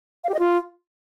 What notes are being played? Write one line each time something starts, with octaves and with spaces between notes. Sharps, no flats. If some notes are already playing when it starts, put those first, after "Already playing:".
F5
G4
D#5
F4